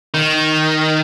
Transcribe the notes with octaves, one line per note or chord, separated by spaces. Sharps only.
D#3